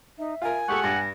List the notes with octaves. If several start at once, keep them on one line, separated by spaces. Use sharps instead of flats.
D#4 E5
F4 A#4 G#5
G#3 G4 A4 F#5 C#6
G2 A#6